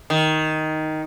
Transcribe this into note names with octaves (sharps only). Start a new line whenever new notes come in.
D#3